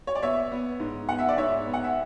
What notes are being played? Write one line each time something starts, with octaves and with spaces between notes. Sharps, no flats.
C#5
D5
B3 C#5 E5
B3
G#2
B3 F#5
E5
D5
G#2 C#5 E5
B3
F#5
E5